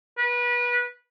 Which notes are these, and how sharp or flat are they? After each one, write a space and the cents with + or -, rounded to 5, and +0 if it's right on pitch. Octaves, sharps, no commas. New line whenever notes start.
B4 -25